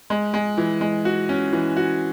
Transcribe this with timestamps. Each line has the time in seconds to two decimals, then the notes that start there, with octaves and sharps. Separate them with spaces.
0.10 G#3
0.34 G#3
0.58 E3
0.81 G#3
1.05 F#4
1.29 C#4
1.53 E3
1.77 F#4